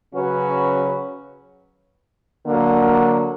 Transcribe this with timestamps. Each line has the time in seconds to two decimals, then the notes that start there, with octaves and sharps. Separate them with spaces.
0.14 C#3 F#3 C#4 F#4 B4
2.46 D3 F#3 A#3